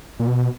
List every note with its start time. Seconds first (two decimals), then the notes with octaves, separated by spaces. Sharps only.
0.19 A#2
0.27 B2